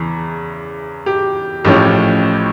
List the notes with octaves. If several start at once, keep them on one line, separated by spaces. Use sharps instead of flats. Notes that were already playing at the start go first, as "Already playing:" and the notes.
Already playing: E2 C#3 E3
G4
A1 A2 F3 C#4 G4